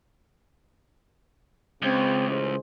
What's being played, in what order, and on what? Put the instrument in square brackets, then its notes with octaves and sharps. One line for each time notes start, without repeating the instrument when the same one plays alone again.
[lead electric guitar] C#2 [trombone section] C#3 C4
[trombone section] A1 G#3 C5